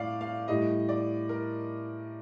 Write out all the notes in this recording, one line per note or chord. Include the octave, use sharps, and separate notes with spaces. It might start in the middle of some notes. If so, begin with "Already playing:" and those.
Already playing: A2 D5 F5
F5
A2 G3 D#5
D5
A#4